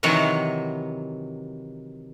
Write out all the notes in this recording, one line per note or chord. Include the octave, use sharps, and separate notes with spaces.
C3 D#3 E3 F#3 F#4